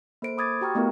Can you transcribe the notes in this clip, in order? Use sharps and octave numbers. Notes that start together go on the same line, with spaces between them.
A#3 A4 C5 D7
B5 D6 D#6 G#6 A6
F#4 G4 G5 A#5 C#6 F6
A3 B3 E4 A#4